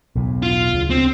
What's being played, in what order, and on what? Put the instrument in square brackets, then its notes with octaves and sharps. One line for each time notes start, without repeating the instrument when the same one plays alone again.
[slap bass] B1 E2 A2
[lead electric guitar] F4
[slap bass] D2 C#3
[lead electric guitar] C4